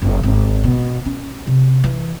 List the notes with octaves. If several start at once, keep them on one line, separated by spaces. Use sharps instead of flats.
F#1
G#1
B2
C#4
C3
E3